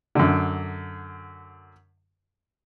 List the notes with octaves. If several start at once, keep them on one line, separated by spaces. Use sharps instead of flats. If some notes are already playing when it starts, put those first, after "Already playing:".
F#2 D3